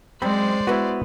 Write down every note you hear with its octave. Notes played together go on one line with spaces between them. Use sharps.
F#2 G#3 C4 C5 D5 B5
B3 E4 F#4 B4